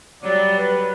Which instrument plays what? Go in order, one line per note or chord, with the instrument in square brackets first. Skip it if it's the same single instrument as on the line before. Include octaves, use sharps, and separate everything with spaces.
[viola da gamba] F#3 G3 [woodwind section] D5
[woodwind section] B4